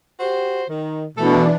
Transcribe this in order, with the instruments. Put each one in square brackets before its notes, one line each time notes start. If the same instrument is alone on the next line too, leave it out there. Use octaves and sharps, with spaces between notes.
[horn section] F#4 G4 C5
D#3
[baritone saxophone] B2 [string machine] E3 D4 [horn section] A3 A4